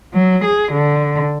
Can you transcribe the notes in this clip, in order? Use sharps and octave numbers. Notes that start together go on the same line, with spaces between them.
F#3
G#4
D3